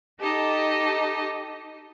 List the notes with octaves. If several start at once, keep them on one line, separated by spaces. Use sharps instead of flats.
D#4 G4 A4 D#5